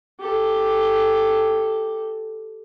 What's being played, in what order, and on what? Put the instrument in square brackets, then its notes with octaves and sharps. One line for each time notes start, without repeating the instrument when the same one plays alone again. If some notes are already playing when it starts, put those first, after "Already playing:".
[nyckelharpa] G4 A4